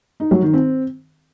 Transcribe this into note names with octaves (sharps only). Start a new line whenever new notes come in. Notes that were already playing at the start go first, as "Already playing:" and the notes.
D#4
F#3
D#3
C4